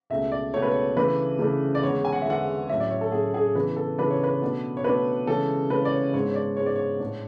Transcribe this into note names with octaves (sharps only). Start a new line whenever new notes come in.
C#2 B2 A3 E5
D5
C#2 B2 A3 C#5
B4
C#5
C#3 E3 A3 D4 B4
C#3 E3 A3 D4
D5
E2 D3 G#3 C#5
G#5
F#5
E5
E2 D3 G#3 F#5
A2 F#3 C#4 E5
D5
C#5
A4
A2 F#3 C#4 G#4
G#4
C#3 E3 B3 D4 B4
A4
C#3 E3 B3 D4 B4
C#5
B4
B2 A3 D4
C#5
B2 A3 D4 B4
C#3 E3 G#3 C#4 A4
C#3 E3 G#3 C#4 B4
D5
C#5
G#2 G#3 B3 D4 C#5
C#5
D5
G#2 G#3 B3 D4 C#5
D5
C#5
A2 G#3 D4